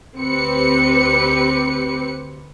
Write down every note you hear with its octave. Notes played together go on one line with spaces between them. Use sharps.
D2 C4 G4 B4 C#7